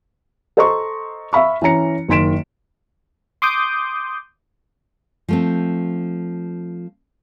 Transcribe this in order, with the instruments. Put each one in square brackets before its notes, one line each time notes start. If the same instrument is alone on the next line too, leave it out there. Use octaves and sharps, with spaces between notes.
[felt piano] A4 C5 D#5 A#5 C6 C#6
E5 F5 B5 C#6
E3 C#4 A#5 C#7
F#1 D#3 C6 B6 D7 E7
[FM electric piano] C6 D6 D#6 G6
[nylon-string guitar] F3 A3 C4